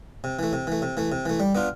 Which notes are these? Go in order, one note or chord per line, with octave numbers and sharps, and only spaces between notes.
C3
E3 A3
C3
E3 A3
C3
E3 A3
C3
E3 A3
G3
B3 D4 F4